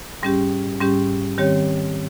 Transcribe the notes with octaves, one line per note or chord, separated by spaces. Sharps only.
G#2 G3 C#4 G4
G#2 G3 C#4 G4
D#3 G3 C4 G4 C#5